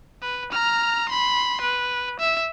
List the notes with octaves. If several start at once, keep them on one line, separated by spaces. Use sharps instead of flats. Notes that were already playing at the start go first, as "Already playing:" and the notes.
B4
A#5 F6
B5 C6
B4
E5